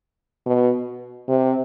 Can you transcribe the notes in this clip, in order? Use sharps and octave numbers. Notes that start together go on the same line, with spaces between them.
B2
C3